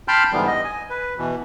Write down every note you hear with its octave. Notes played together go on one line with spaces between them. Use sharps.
G5 A5 B5 C6 F6 G6
G#2 D3 E3 G3 B3
D#5
G#5
B4
B2 E3